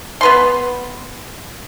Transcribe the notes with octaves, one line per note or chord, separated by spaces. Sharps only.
B3 B4 C6